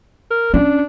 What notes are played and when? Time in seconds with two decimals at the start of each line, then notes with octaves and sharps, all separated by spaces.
0.31 A#4
0.54 C#4 D4